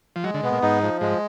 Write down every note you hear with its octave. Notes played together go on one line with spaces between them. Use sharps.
F3
F#3 G#3
D3
B2 B3
A#2
G#2 D#4
F3
G#2 G#3